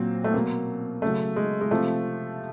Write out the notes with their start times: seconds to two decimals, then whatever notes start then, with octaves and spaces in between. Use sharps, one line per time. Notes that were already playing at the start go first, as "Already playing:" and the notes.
Already playing: A#2 F#3 C4
0.24 A3
0.34 B2 F#3 A#3
1.02 C#3 F#3 A3
1.36 G#3
1.61 G#3
1.71 C3 F3 A3